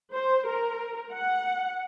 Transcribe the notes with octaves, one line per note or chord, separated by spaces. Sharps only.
C5
A#4
F#5